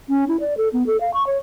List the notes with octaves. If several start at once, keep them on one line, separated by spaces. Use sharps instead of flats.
C#4
E4
D5
A4
B3
A4
F5
C#6
C#5